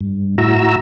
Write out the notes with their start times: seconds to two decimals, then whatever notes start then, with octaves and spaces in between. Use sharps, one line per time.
0.01 G2
0.38 A2 E4 F#4 A#5 E6